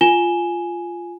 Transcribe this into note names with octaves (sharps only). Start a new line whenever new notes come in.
F4 G#5 E7 G7